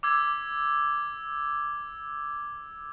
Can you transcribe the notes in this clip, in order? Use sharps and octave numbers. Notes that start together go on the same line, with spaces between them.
D6 E6 G#6